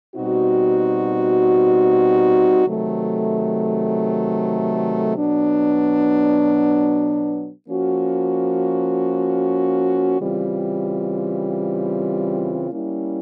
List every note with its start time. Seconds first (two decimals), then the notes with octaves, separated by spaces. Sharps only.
0.15 B2 G3 C4 D#4 F#4
2.66 C3 D#3 F#3 A3
5.17 B2 F#3 B3 D4
7.68 F3 A#3 C#4 F#4
10.20 C#3 E3 G3 C4 F4
12.70 G3 A#3 C#4 E4